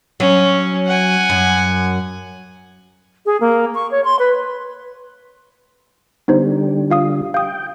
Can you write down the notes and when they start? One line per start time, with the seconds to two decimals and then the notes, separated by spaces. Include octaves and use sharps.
0.20 F#3 C#4
0.87 F#5 G#5
1.30 F#2
3.26 G#4
3.41 A#3
3.75 C#6
3.91 C#5
4.04 C6
4.19 B4
6.28 D3 G3 B3 D#4 C5
6.90 F4 F5 D#6
7.34 F5 G5 D#6